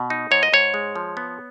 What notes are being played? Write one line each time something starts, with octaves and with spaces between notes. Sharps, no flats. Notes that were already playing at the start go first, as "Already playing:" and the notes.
Already playing: B2
D#4
G#2 C#5
D#5
G#2 C#5
G#3
F3
B3